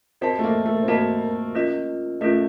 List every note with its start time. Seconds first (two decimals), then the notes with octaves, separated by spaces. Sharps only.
0.21 C4 F#4 A#4 D#5 A5
0.39 A3
0.44 A#3
0.66 A3
0.83 C4
0.88 A#3 F#4 A#4 D#5 A5
1.55 C#4 F4 A#4 D#5
2.21 A3 C#4 F4 A#4 D#5